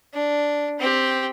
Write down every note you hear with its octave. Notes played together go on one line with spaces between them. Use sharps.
D4
C4 G4